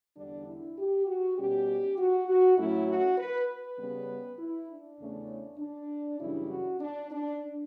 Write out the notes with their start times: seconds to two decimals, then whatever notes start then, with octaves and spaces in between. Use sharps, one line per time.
0.16 E2 D3 G3 D4
0.47 E4
0.78 G4
1.07 F#4
1.38 B2 G3 C#4 G4
1.97 F#4
2.28 F#4
2.57 A2 F#3 A3 C#4 E4
2.88 F#4
3.18 B4
3.49 B4
3.78 C#3 G3 B3
4.38 E4
4.69 D4
4.98 E2 C#3 E3 A3 C#4
5.59 D4
6.19 F#2 C#3 E3 G3 E4
6.49 F#4
6.79 D4
7.10 D4